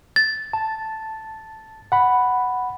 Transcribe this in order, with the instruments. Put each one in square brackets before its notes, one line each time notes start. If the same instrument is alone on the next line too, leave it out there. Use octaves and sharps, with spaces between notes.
[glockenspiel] A6
[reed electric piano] A5
F#5 B5